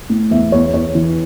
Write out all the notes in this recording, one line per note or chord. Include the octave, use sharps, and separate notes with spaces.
A2
E2 E5
E2 C#5
E2 C#5
E3